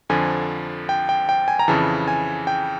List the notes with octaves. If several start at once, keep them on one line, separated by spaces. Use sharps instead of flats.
F2 D3 F3 G#5
G5
G5
G5
G#5
A#5
F2 C#3 E3 A5
G#5
G5